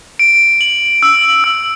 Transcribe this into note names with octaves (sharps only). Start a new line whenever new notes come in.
D7
F#7
E6
E6